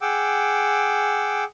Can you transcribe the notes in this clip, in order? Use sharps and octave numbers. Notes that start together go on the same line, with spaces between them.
G#4 F#5 G5 D6 E6